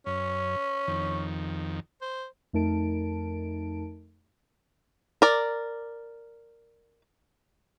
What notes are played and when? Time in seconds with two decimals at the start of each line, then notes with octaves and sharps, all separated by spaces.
0.06 F#2 C#4
0.88 F2 D#3
2.01 C5
2.53 F2 A3 D#4 A#4 A5 D7
5.22 A#4 D5